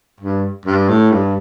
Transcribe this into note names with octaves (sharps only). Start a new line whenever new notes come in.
G2
G2
A2
G2